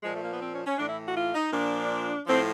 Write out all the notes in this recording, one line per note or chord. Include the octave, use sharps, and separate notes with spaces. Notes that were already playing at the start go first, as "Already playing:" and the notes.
A#2 F3 G#3
A3
A#3
B3
C4
C#4
C#4
A2 E3 D4
E4
F#4
F4
D#4
A#2 F3 D4
A2 F3 C4